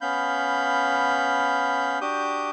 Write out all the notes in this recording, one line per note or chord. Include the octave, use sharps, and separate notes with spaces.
B3 C#4 F5 B5 G6
D4 F#4 G4 D6 D#6 G6